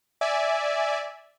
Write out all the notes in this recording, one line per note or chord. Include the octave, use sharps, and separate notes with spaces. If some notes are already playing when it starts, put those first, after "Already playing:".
D5 E5 G#5